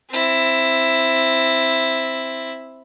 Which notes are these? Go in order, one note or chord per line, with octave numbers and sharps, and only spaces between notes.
C4 E4